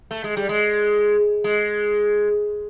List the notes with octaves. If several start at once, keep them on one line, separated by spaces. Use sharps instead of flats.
A3
G#3
G3
G#3
G#3